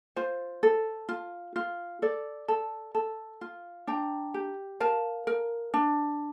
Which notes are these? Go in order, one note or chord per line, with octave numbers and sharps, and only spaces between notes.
F4 C5
A4
F4
F4
A4 D5
A4
A4
F4
D4 G5 A#5
G4
A#4 F5 A5
A#4
D4